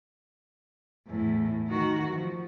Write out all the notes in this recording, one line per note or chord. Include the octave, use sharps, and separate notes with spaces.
E2 A2
D#3 F#4
F3